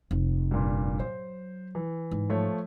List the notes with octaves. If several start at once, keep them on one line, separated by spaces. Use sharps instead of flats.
F1
G2 A#2
F#3 C5
E3
G#2
F3 A3 C#5